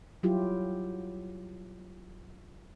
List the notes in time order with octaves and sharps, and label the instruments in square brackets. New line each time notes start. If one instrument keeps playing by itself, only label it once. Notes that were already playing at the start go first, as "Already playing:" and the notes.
[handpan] F#3 G3 E4 F4 G4